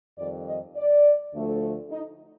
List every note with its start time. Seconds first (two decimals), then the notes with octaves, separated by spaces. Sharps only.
0.18 F2 D#3 G3 D5
0.47 D#5
0.77 D5
1.33 D2 D3 F3 A3
1.91 D#4